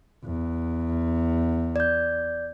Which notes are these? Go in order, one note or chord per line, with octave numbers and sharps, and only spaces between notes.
E2
D5 G6